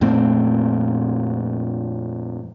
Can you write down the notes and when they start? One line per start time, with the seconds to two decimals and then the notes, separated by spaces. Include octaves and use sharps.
0.01 F2 A#2 A3 C4